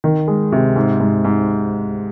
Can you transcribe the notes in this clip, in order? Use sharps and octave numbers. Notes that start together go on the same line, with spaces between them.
D#3
G#3
C3
G#2
G#2
G#2